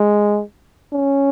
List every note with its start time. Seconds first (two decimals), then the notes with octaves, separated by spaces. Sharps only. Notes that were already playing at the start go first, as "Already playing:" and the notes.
Already playing: G#3
0.93 C#4